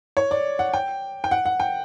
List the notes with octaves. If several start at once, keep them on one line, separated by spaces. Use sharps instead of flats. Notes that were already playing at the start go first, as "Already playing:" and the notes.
C#5
D5
F#5
G5
G5
F#5
F#5
G5